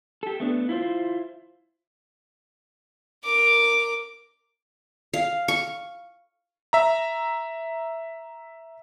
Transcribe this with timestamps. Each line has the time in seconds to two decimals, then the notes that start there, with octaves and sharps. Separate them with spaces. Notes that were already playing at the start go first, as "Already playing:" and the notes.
0.23 G4 A4
0.40 A3 B3 D4
0.69 E4 F4 C5
3.24 A#4 D6
5.13 F5
5.48 C#6
6.73 E5 A#5